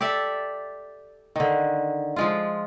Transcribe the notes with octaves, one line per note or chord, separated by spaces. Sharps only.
G4 A4 D5 E5
D3 D#3
F3 G#3 F4